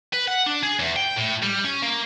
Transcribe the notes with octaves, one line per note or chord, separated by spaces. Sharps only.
B4
F#5
D4
G#4
E2
G5
A2
G3
C#4
A#3